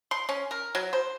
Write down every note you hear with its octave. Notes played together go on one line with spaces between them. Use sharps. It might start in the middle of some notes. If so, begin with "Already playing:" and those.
C6
C#4
A#4
F#3
C5